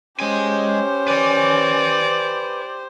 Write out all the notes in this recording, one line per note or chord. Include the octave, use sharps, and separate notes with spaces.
G#3 C#4 G4 C5 G#5
B4 D5 G#5